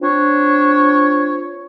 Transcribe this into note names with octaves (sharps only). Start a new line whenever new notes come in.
C4 D4 F4 C#5